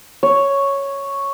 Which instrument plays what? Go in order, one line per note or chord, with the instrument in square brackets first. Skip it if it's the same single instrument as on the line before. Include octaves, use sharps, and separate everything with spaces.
[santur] C#5